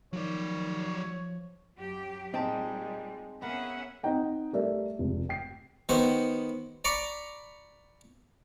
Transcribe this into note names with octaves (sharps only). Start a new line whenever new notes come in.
D#3 F3 F#3 C#5 D5
F#2 F#3 G4
A#2 G3 G#3 C4 D#4 G5 A5
A#3 B3 C#4 G#4 E5 F#5
C4 D#4 D#5 F#5 G5 A#5
G3 A3 A#4 D5 E5
F1 C#2
G5 C7
D#3 B3 F#4 C5
D5 A#5 B5 C#6 D6